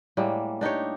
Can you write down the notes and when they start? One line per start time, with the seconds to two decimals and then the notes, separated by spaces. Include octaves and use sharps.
0.17 A2 G3 G#3 A#3
0.61 D4 D#4 G4 C#5